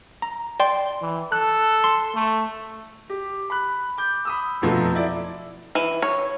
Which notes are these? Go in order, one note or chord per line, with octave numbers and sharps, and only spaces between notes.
A#5
D5 G5 C6
E3
A4 F#6
C6
A3
G4
B5 F#6
D6 G6
B5 D#6 E6
F2 B2 F3 F#3 A3
E4 D5
E3
C#5